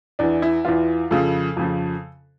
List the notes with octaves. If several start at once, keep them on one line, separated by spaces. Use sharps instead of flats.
E2 E3 D4
E4
E2 E3 F4
F2 C#3 F3 A4
F2 C#3 F3